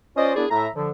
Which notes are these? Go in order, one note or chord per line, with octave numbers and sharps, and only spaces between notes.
C#4 F4 C5 D5 D#5
F#2 B3 D4 E4 G#4 D5
A2 E5 A#5
D3 F3